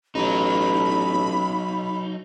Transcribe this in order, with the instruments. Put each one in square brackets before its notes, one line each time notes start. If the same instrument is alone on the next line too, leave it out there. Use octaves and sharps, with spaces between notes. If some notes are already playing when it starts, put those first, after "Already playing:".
[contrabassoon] A1 [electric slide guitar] F#3 D#4 [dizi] B5